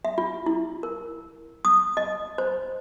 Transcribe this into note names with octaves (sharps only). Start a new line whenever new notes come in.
E5
F4
E4
A#4
D#6
D#5
C5